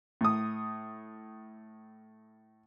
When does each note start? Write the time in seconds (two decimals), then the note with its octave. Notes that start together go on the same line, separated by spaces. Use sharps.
0.21 A2 D#6